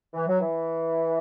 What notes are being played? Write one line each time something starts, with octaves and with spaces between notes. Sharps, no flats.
E3
F#3
E3